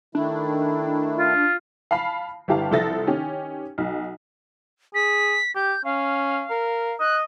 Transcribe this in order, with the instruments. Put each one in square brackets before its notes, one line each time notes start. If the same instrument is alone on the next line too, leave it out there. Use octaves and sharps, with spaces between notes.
[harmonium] D#3 A3 E4 [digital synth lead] D4
[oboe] F4
[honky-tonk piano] F5 A5 B5 C7
G1 E4 G4 F5 A5
C2 F3 A4 E5 A6 A#6
D#3 C#4 G4
B1
[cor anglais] G#4 [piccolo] B6
[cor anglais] G4 [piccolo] G6
[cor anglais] C#4 [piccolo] F5
[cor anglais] A#4
[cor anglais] D#5 [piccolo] F#6